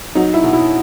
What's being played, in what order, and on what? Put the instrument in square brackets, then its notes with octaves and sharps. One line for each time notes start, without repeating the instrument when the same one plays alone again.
[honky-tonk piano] F#3 [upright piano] D#4
[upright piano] E4
[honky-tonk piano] B2
[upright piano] E4